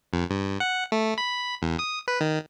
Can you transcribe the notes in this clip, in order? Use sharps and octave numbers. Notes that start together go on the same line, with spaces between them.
F2
G2
F#5
A3
B5
E2
D#6
B4
D#3